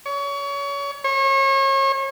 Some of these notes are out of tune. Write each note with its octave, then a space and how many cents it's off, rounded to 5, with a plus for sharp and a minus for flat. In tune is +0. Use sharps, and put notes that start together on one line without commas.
C#5 +30
C#5 -35